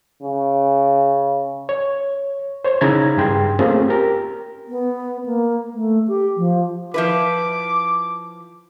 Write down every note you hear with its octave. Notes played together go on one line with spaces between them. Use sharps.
C#3
C#5
C5 C#5
C#3 D#4 E4 A#5 B5 G#6
G2 G#4 G5 C6
A3 A#3 C4 C#4 F4 G#4
G4 A#4
B3
A#3
A3
G4
F3
F3 E4 B4 D6